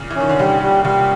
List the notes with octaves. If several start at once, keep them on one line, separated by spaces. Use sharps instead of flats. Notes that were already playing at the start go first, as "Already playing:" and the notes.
Already playing: A#2 C#3
E3
D#3 C#4
D3
C#3 G3
G3
C#3 G3